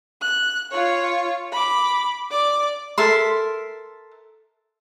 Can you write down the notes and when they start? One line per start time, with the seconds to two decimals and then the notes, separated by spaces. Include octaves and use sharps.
0.21 F#6
0.72 F4 C#5
1.52 B5 D6
2.31 D5 D6
2.98 A4 A#4 E5 C6